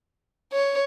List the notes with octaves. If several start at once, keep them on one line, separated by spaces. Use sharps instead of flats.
C#5